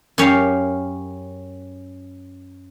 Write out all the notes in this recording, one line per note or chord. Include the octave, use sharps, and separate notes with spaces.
F#2 C#4 G4 F5